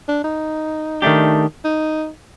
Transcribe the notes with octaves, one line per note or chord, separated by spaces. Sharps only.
D4
D#4
D#3 A3 D4 G4
D#4